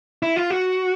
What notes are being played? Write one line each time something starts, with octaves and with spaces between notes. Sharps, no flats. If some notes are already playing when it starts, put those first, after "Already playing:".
E4
F4
F#4